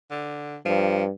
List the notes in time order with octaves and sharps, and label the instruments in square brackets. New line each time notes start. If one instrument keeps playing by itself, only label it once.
[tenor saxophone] D3
[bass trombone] G2 [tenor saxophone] F3